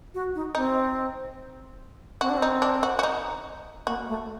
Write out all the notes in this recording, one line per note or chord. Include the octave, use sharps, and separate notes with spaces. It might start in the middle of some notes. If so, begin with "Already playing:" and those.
F#4
D#4
C4 D#4
C4 F#4
D4
C4
D#4
D4
F#4
F#4
D#4
A#3 F#4
A3